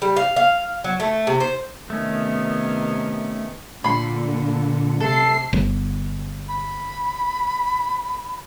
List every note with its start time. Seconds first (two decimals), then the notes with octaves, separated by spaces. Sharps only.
0.02 G3
0.16 F5
0.36 F5
0.84 F#3
1.00 A3
1.27 C3
1.40 C5
1.90 C3 D#3 A3 B3 C#4
3.84 A#2 D3 B5 C6
5.00 C3 A4 C7
5.53 G1
6.48 B5